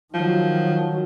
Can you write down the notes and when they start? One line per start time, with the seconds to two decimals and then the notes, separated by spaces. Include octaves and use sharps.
0.14 D#3 F3 F#3